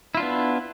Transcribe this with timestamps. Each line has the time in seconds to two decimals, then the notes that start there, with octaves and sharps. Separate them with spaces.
0.15 E4
0.17 F4
0.20 D4
0.22 B3